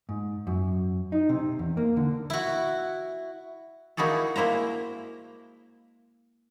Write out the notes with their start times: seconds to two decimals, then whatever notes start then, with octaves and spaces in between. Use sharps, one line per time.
0.09 G#2
0.47 F#2
1.12 D#4
1.29 C3
1.59 E2
1.77 A#3
1.97 D3
2.30 E4 F#4
3.97 A#3 D#4 E4 F#4 G#4 A4
4.36 G#3 A#3 E4 C5 A#5